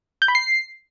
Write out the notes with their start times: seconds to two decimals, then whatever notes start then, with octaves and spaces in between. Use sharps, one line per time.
0.22 G6
0.28 B5
0.35 C7